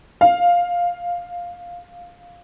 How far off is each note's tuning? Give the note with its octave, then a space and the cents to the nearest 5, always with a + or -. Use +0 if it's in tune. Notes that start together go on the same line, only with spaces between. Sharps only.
F5 +10